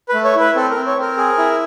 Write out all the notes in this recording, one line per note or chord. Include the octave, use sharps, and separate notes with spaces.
B4
A3
C#5
E4 B4
C4 A4
A#4
C4
C#5
C4 A#4
G#4
E4